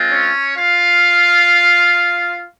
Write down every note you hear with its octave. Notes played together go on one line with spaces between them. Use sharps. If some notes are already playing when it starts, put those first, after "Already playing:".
Already playing: G#3 C4 F4
C#4 C#5
F4 F5